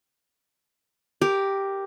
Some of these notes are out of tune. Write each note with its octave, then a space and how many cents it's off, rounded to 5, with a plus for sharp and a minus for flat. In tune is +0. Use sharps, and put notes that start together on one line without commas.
G4 +0 A#4 +0